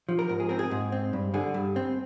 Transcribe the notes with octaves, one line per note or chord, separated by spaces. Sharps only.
F3
A#4
G#2 A#4
G#4
C4 A#4
G#4
G#2
C4
G2
D3 G#4
G2
C4